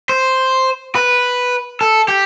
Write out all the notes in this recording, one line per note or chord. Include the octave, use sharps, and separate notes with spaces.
C5
B4
A4
G4